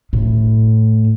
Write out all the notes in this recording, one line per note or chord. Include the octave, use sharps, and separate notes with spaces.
A2